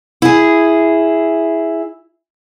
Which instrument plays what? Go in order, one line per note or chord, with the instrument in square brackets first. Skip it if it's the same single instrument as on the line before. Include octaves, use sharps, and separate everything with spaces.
[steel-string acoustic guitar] E4 G#4